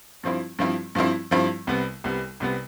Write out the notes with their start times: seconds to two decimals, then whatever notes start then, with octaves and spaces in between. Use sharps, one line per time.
0.23 G2 F3 C4 E4
0.59 G2 F3 C4 E4
0.95 G2 F3 C4 E4
1.31 G2 F3 C4 E4
1.67 C2 C3 G3 B3
2.04 C2 C3 G3 B3
2.40 C2 C3 G3 B3